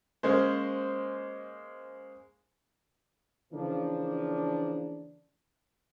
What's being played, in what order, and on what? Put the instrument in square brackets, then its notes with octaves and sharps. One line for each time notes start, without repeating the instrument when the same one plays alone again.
[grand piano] G#3 A#3 C#4 C5
[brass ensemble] C#3 E3 F3 A#3 D4